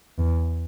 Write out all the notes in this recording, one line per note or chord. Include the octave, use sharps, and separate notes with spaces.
E2